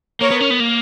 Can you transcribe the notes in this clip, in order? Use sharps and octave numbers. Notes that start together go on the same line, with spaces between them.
A#3 A#4 C#5
B3
C#4
B3
A#3